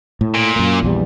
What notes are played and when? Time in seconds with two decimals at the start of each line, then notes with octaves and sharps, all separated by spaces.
0.21 A2
0.34 A#2
0.56 F#2 A#3
0.83 A#1 E2 G3